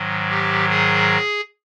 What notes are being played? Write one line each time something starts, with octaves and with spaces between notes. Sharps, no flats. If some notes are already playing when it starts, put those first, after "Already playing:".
Already playing: G#2 D#3 F#3
G4
G#4